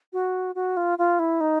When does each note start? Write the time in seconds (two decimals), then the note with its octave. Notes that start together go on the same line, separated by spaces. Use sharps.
0.13 F#4
0.55 F#4
0.77 F4
0.98 F4
1.19 E4
1.41 D#4